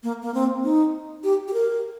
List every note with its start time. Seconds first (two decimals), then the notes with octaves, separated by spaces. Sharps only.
0.03 A#3
0.22 A#3
0.34 C4
0.64 D#4
1.24 G4
1.48 G4
1.53 A#4